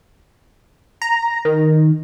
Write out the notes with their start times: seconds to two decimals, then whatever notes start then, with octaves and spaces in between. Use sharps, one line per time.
1.02 A#5
1.45 D#3